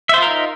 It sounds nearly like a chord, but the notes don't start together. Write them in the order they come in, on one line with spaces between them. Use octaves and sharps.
E5 C5 F4 A#4 D#4